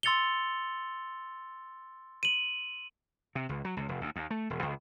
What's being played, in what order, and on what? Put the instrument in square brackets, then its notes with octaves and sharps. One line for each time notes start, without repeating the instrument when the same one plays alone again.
[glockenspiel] C6 E6 A6 C#7 F7 G7
D#7 F#7
[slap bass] C3
C#2
F#3
C#2
F1
D2
D#2
A3
E1
C#2